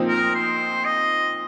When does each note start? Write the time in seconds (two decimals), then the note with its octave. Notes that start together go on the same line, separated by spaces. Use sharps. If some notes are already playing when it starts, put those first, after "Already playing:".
Already playing: A#2 F3 C4 D#4
0.08 A#4
0.35 C5
0.85 D#5